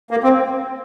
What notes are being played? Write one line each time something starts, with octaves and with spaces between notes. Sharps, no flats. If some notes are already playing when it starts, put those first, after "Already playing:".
A#3
C4